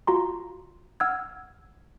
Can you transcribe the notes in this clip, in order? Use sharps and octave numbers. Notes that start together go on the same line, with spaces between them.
F4 F#4 A#5 C6
F#5 E6 F6 G#6